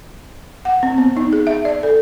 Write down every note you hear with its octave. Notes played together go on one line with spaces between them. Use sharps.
F#5
C4
B3
D#4
G#4
E5
D5
A4